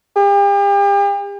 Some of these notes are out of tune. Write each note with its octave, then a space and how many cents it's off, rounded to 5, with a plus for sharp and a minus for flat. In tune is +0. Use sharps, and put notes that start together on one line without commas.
G4 +40